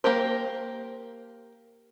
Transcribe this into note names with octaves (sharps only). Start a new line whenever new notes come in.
A#3 G4 A#4 C5